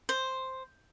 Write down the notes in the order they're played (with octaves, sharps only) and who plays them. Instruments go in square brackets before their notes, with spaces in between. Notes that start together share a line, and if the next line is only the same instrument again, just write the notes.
[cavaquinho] C5